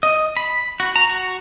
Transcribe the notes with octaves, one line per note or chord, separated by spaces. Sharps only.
D#5
B5
F#4
A#5
F#4